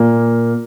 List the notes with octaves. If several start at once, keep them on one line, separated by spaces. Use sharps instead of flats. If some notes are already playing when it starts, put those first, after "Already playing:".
Already playing: A#2 A#3